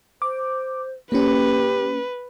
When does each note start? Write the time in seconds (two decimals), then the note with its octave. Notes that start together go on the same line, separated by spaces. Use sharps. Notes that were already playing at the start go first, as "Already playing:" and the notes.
0.22 C5 D6
1.12 A#3 C#4 G4 B4